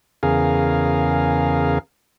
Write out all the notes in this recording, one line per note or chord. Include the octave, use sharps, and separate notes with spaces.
E2 C#3 G#4 A#4 F5